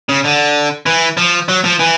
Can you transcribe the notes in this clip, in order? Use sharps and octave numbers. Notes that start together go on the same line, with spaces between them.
C#3
D3
E3
F3
F#3
F3
E3